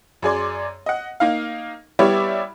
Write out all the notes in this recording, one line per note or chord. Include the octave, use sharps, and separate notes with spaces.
F#2 G#4 D5 C6
D#5 F#5
A#3 D#4 F5
G3 B3 E4 G4 C#5 D5